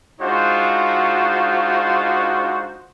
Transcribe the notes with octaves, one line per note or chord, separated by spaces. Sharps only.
G#3 D4 D#4 F4 F#4 C5